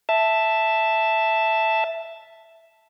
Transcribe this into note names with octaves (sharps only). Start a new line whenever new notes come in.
E5 A5